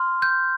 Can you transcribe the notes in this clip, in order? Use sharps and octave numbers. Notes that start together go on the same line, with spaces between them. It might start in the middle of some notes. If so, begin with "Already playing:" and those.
Already playing: C6 F6
G6